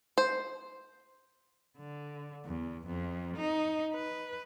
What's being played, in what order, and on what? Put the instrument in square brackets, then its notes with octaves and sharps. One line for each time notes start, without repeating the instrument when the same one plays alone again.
[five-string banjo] C5
[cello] D3
E2
F2
D#4
B4